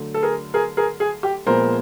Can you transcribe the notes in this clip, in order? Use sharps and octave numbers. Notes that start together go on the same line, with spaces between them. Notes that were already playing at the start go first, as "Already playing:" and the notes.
Already playing: D3 F#3 A3
A4
G#4 A#4
G#4 A#4
G#4 A#4
G#4
G4
A#2 F3 G#3 B3 A#4 C5